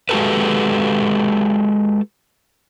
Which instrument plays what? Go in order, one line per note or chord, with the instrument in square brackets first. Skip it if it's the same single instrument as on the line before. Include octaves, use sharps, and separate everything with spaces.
[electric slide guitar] G#3 F#4 G4 A4 B4